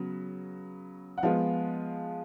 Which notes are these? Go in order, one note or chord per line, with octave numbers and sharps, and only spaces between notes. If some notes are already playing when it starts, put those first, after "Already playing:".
Already playing: C#3 F#3 B3
F#5
F3 G#3 B3 F4 F5